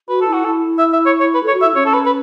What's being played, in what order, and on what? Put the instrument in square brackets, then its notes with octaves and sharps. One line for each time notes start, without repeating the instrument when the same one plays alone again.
[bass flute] F#4 [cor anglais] B4
[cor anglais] A4
[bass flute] E4
[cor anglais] F#4
[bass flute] E4 [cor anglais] A4
[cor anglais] E5
E5
C#5
C#5
B4
[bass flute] A4 [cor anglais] C#5
[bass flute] F#4
[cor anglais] E5
[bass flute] E4
[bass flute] C#4 [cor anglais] C#5
[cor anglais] A4
B4
B4